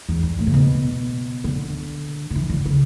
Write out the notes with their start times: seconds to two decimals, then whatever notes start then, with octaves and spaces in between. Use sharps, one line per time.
0.09 E2
0.23 G2
0.39 A2
0.47 C#3
0.54 B2
1.44 D3
2.31 D3
2.36 E3
2.50 D3
2.66 C#3